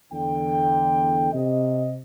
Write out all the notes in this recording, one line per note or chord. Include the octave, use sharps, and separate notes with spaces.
E2 D3 G5
C3 D#5